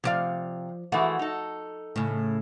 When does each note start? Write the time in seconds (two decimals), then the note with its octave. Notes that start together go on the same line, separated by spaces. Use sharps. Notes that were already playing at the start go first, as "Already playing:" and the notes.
0.04 C3 F3 D5 F5
0.92 E3 G#3 A3 F#4
1.19 D#4 A4
1.96 A2 C#3